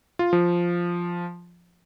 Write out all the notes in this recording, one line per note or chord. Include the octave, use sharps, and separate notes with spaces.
F4
F3